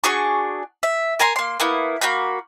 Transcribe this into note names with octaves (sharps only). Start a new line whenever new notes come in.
D4 F#4 G#4 C#6
E5
A#4 G#5 A#5 C6
A#3 C6
A#3 B3 E4
A#3 F#4 B5 G6